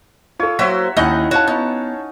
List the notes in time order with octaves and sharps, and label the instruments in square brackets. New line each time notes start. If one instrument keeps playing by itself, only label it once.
[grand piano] F4 A4 [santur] C#5
[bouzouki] F#3 A#3 C5 [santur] F#4 E5 [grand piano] B6
[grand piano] D#2 G7 [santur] C#4 D#4 E4 [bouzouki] D#5 F#5
[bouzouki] F#4 [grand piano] C#5 F5 A5
[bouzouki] B3 [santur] D#4